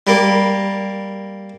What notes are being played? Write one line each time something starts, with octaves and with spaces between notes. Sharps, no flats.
G3 A#3